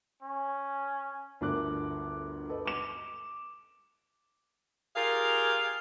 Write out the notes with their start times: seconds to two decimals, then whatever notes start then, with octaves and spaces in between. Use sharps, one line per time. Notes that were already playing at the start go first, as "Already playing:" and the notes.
0.22 C#4
1.41 G1 D2 D4 A#4 D6 F#6
2.49 A4 B4 D#5
2.66 D6 E7
4.95 F4 G4 G#4 A#4 F5